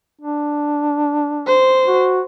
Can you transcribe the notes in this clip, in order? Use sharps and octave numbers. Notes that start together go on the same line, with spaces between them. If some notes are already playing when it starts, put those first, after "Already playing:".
D4
C5
F#4